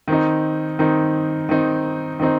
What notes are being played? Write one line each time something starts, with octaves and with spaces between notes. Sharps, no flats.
D#3 C4 D#4
D#3 C4 D#4
D#3 C4 D#4
D#3 C4 D#4